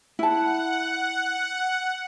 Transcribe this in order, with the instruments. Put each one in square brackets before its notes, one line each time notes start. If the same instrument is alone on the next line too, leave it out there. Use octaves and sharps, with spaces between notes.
[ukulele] E4 A5 [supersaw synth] F#5